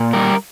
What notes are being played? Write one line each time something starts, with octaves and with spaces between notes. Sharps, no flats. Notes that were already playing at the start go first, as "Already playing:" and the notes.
Already playing: A#2
G3 A#4